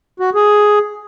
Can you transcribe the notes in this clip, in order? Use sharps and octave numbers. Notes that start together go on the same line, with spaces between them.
F#4
G#4